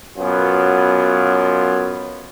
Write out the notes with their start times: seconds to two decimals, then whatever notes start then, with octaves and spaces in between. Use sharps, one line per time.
0.17 F#2 B2 B3 F4